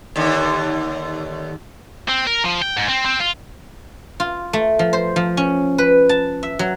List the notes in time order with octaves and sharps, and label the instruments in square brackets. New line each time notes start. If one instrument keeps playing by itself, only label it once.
[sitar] D#2 D3
[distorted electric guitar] C4
A#4
F3
G5
G#2
C4
C4
F4
[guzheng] F4
A3
F3
C5
F3
C#4
B4
A5
E5
F#3